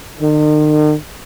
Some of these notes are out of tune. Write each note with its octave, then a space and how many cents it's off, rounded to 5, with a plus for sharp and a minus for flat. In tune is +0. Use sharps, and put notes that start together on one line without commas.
D#3 -45